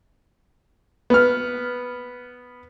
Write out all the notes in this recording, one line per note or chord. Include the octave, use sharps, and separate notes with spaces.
B3 F6